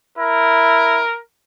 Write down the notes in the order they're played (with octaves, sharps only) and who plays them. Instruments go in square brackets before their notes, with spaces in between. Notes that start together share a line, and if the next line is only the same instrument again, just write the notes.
[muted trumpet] E4 [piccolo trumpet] A#4